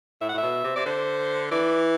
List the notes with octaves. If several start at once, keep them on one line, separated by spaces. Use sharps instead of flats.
A2 E5
F#5
A2
E5
B2
C3
C3 D5
D3 C5
E3 D5